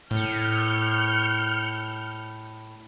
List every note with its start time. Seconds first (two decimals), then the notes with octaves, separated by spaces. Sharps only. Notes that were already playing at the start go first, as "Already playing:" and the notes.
0.11 A2 F6 G6 C#7